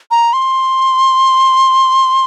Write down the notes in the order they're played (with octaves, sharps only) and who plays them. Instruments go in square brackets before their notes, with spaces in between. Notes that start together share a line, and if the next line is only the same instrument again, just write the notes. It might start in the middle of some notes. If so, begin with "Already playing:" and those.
[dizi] A#5
C6